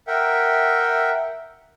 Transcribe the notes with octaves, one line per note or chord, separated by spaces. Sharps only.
A#4 E5 F#5 G5